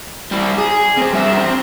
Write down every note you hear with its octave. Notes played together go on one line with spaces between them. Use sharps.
G3 E4
G#4
C3 C4
G2 E5
C4